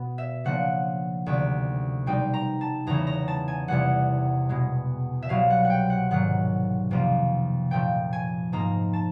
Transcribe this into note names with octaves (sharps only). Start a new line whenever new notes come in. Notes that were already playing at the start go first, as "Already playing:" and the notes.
Already playing: B2 B3
E5
C#3 F3 A#3 D4 F#5
D2 C3 D#3
B2 G3 C4 D#4 G5
A#5
A5
E2 C#3 E3 A#5
A#5
A5
G#5
E2 C3 E3 G3 F#5
B2 G#3 B3
E5
C2 B2 F#3 F5
F#5
F#5
G5
F#5
G#2 D#3 F#3 F#5
F2 C3 F3 A#3
A#2 F3 A3 G5
G#5
G#2 F3 A#3 D#4 A#5
A5